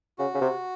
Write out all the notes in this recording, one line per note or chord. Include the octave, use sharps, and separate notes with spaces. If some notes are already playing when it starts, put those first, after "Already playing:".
C#3 F#4
C#3
C3